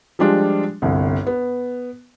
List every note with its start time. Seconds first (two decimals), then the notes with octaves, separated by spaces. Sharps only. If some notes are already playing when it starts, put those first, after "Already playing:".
0.19 F3 G3 G#3 D4 F4
0.82 G1 C2
1.27 B3